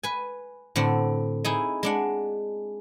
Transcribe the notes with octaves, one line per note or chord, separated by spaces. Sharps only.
B4 G#5
A2 D3 C4 F#5
D#4 E4 G#4
G#3 D4 F#5